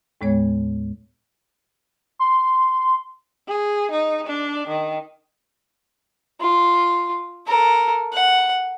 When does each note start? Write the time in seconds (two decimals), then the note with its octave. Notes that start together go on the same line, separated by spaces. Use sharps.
0.21 D#2 A2 G#3 B3 C#5 G#6
2.19 C6
3.48 G#4
3.91 D#4
4.27 D4
4.68 D#3
6.41 F4
7.47 A4 A#4
8.13 F#5